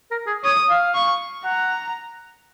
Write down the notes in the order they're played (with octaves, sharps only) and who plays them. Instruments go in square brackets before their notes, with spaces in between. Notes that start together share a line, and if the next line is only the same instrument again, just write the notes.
[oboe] A#4
G#4
[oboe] C#5 [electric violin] D#6
[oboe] F5
[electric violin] C#6
[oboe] F#5 [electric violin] A#5